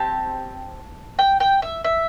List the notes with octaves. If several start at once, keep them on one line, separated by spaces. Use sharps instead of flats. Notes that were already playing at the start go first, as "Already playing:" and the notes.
Already playing: C4 G4 A5
G5
G5
E5
E5